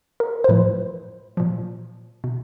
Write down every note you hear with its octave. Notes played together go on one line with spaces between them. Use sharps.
A#4
C5
A2 F3 B4
A#2 F3
B2